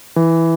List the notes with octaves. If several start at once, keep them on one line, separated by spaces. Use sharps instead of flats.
E3